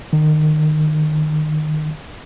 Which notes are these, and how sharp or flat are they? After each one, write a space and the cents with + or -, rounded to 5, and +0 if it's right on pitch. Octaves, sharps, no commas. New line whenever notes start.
D#3 -25